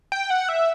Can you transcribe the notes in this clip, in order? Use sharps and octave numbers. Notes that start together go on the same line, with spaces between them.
G5
F#5
E5